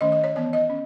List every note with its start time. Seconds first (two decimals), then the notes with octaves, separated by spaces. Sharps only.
0.01 D#3 A3 C#4 D#5
0.12 D#5
0.24 C#5
0.35 E3 B3 C#5
0.53 D#5
0.70 C#4